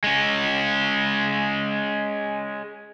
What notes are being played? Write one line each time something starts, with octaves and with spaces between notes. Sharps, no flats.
G#3 C#4